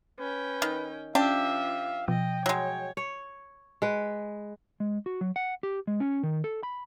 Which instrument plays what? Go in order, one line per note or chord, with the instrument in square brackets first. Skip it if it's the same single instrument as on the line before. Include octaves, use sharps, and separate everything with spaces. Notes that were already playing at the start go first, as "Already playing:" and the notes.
[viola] C#4 G5 [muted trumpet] B4
[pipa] D#3
[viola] F3 E5 [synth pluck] C#4 [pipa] D4 G4 [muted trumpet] F5
[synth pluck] B2 F3 [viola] D#5 [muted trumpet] G5
[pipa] F#3 G#3 [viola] C#5
[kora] C#5
G#3 B4
[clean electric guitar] G#3
F#4
F#3
F#5
G4
G#3
C#4
D#3
A4
B5